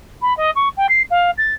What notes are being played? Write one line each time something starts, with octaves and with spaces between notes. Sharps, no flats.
B5
D#5
C#6
G5
C7
F5
A6